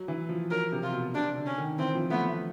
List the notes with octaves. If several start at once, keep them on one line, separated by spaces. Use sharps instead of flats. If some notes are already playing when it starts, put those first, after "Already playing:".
Already playing: F#3
E3
F3
F#3 A#4
C3
F4
B2
C3 D4
D3
C#4
D#3
E3 C4
F3
A3 B3
A3